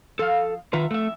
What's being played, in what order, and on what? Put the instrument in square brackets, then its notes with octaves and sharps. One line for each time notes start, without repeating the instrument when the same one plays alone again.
[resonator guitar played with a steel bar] F3 F5 [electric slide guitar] A4
[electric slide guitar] D#3 F4 B4 [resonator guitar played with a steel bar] E5 F#5 A#5
[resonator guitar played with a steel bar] F2 E5 [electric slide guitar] A3